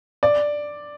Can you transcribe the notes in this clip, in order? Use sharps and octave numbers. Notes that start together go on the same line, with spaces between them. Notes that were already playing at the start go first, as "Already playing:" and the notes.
D5